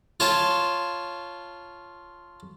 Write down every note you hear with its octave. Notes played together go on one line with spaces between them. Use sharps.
F4 C#5 A5